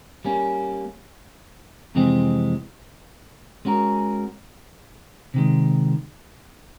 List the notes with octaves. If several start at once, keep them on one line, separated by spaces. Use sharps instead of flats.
G3 A#3 C#4
F2 C3 E3 G#3 C4
G#3 C#4 F#4 A#4
C3 D#3 G#3